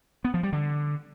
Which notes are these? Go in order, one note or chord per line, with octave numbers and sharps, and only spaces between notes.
B3
F3
G3
D3